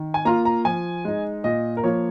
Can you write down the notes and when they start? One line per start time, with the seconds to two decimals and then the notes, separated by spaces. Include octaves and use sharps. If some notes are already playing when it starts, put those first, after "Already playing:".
Already playing: D#3
0.14 G#5
0.25 A#3 F4 A#5
0.45 A#5
0.65 F3 G#5
1.05 G#3 D#4
1.44 A#2 D#5
1.77 A#4
1.83 F3 A#3 C#5